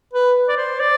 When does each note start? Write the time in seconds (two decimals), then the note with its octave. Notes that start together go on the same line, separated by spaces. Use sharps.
0.13 B4
0.48 D5
0.57 C5
0.80 D5